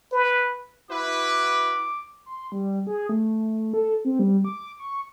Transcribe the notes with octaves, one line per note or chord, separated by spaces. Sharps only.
B4
E4 F#4 B4 D6
C6
G3
G#4
A3
A4
C4
G3
D6
C#6